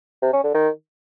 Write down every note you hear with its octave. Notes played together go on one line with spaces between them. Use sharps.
C3
C#4
D3
D#3